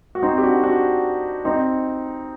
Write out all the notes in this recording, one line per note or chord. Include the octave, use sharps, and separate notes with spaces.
F#4
C4 D#4
G4
D4 F#4
D4 F#4
C4 D#4